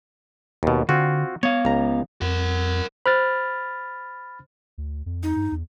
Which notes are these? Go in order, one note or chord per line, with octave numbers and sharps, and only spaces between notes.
D#2 B2
D3 C4 F4 F#4
B3 C#5 F5
C#2 A#5
F2 A#4 F#5
C5 B5 F6 A6
D2
F2
D#4
G2
E2